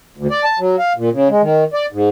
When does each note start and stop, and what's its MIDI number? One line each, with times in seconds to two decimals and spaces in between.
0.17 0.27 38
0.31 0.44 74
0.44 0.59 81
0.59 0.76 54
0.79 0.93 77
0.96 1.09 46
1.12 1.28 49
1.29 1.42 56
1.42 1.64 51
1.74 1.86 74
1.92 2.09 44